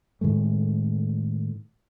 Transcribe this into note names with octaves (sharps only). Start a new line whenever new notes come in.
A2 D#3 G#3 A3